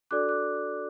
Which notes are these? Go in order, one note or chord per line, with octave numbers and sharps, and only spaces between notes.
D4 F#4 A4 D5 D6 F#6
D6 F#6